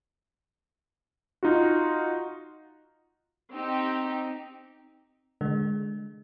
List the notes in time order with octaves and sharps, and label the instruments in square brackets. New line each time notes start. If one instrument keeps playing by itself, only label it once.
[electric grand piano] D#4 F4 F#4
[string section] C4 D#4 G4
[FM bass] D3 [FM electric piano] G#3